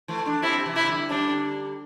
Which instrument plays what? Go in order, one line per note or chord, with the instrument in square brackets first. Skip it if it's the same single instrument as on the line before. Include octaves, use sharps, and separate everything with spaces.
[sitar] E3 A3
A3 D4
[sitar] G3 C4 [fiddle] E4
[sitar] G3
C3 E3
[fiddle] E4
[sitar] D3 G3
[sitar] D3 G3 [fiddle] D4